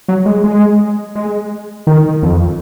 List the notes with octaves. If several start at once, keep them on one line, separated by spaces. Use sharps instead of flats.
F#3
G#3
G#3
G#3
D#3
F2